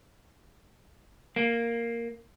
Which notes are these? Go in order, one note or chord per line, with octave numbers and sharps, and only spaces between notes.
A#3